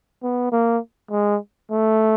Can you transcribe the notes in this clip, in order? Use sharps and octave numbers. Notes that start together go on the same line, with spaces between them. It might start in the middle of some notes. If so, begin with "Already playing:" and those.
B3
A#3
G#3
A3